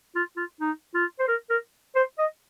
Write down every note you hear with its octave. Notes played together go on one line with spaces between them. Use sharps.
F4
F4
D#4
F4
C5
A#4
A#4
C5
D#5